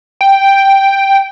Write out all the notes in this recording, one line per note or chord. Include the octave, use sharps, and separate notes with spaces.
G5